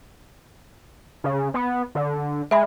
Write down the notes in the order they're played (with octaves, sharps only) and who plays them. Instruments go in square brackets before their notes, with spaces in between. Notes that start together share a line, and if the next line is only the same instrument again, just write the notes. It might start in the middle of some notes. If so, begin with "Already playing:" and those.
[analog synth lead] C#3
B3
D3
[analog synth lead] G#3 [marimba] E5 B5